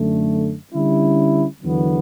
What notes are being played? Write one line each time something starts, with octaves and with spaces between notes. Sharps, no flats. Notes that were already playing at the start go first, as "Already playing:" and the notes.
Already playing: F#2 D3 A3
D3 G3 C#4 E4
E2 D3 F#3 B3